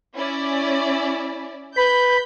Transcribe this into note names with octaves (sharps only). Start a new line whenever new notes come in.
C#4 E4 D5
B4 B5 G6